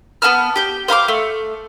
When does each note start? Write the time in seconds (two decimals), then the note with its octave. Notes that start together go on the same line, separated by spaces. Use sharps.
0.22 B3 E4 A5 F6
0.56 G4 G5
0.88 C5 F5 B5 D6
1.08 A3